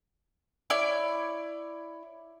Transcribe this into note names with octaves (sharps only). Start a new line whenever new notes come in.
E4 C#5 D5